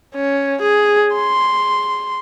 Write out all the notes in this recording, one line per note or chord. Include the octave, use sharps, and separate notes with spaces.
C#4
G#4
C6